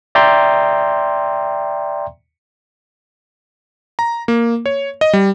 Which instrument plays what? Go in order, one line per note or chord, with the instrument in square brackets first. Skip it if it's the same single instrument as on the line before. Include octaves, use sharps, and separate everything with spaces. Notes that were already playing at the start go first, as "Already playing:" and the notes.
[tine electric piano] D5 E5 G5 A#5 C6
[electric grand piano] A#5
A#3
C#5
D#5
G3